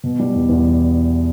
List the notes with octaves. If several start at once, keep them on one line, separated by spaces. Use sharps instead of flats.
B2
G3
E2
E2